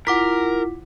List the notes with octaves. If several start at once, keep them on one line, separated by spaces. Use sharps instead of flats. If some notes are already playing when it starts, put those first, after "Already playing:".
E4 F4 A#4 F#5 D6 B6